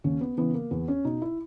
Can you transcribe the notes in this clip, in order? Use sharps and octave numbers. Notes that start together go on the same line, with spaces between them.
D#2 C#4
B3
C#3 E3 B3
A#3
E2 B3
C#4
B2 D#4
E4